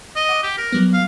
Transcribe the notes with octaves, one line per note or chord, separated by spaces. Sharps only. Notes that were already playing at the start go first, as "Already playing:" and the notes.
D#5
F#5 D6
G4
A#4
F#3 G3 B3
F5